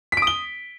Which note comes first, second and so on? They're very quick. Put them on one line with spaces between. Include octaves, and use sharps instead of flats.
B6 D7 D#6 G7